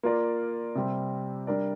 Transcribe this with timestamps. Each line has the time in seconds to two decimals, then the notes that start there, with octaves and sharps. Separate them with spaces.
0.03 A#3 F4 A#4 D5
0.75 C3 G3 C4
1.47 G3 D4 A#4 D5